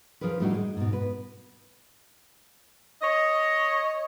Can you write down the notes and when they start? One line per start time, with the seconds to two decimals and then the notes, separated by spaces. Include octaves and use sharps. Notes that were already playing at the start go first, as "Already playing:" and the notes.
0.21 F3 C#4 G#4 A#4 B4
0.40 A2 G3 A3 D4 D#4 F#4
0.54 G#3
0.77 G#2 B2
0.93 B4
3.02 C#5 D#5